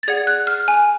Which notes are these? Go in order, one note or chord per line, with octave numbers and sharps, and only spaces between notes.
A6
G#4 D5 F#5 G#6
F#6
F6
G#5